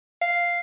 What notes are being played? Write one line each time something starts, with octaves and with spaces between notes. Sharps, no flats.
F5